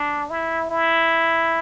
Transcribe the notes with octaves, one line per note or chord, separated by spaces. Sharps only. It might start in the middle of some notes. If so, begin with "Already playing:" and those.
Already playing: D4
E4
E4